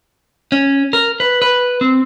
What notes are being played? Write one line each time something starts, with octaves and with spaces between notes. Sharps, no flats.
C#4
A#4
B4
B4
C4